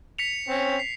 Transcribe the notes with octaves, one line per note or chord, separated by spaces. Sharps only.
B6 C#7 F7
C4 C#4
C7